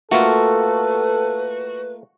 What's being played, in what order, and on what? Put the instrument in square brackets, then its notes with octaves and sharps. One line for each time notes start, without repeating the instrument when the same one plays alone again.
[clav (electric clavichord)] A3 A#3 F4 [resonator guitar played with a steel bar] F#4 [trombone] A4 [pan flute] B4